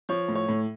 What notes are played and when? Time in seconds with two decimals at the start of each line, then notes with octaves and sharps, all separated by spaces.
0.09 F3 C#5
0.29 A2
0.35 C#5
0.49 A2